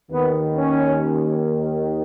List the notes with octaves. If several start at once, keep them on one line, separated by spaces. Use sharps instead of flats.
D#2 D#3 B3
C#4